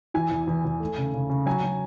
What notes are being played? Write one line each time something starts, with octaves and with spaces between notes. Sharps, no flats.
E3 G#5
E2
E2
E2
A3
C#3
C#3
C#3
F#3 G#5
F#3